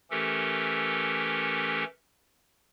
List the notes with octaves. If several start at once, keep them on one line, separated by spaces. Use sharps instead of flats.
E3 A3 C#4 G4 A4 A#4